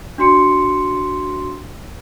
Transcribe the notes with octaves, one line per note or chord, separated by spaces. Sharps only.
D4 F#4 C6 C#7